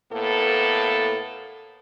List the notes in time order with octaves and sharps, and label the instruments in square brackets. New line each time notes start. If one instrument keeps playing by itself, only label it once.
[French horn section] A2 A#3 B3 A4